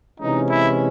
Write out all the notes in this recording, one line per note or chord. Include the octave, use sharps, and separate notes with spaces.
C3 E3 G#3 C#4 D#4
E4